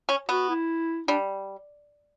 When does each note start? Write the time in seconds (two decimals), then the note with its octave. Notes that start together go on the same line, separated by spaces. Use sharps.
0.09 C#4
0.29 B3 F#4
0.49 E4
1.08 G3 D4